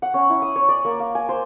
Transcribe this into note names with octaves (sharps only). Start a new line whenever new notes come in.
F#5
C#4
E4
D#6
C#5
D5
A#3
F5
G#5
C5